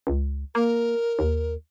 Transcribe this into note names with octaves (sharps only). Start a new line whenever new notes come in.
C#2
A#3 A#4
D#2